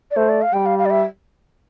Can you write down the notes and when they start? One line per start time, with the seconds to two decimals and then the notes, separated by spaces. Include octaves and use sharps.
0.11 D5
0.16 A3 C5
0.29 D5
0.42 F5
0.53 G3 G5
0.66 F5
0.79 F5
0.86 D5
0.90 E5